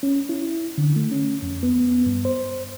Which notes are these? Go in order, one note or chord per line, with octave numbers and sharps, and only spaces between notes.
C#4
E4
D3
A3
C#4
F2
B3
G2
C5